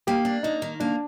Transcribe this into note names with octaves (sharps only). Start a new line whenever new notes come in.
A#3 G4
D4
A#3 D#4
D#3
A#3 D4